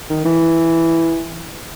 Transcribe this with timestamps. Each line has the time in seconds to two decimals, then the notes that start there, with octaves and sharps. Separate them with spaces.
0.10 D#3
0.26 E3